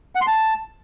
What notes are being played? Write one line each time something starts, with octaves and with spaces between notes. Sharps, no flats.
F#5
C6
A5